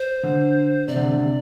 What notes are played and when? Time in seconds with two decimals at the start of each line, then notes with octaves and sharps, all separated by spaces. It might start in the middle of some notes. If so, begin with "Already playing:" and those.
Already playing: C5
0.23 D3
0.88 C3 D5
0.96 D3
1.03 C3
1.12 D3
1.19 C3